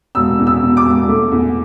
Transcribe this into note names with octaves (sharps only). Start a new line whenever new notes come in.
E1 E6
E2
E6
B2
D6
E1
A3
E2